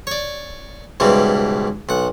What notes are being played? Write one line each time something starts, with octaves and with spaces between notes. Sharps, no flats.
C#5 D5
C#2 G#2 B2 E3 G3
B1 F#5